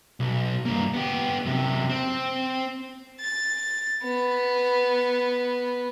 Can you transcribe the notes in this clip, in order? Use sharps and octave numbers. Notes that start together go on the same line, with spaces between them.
B1
G2 A#3
B3 G4
F#2 C3
C4
A6
B3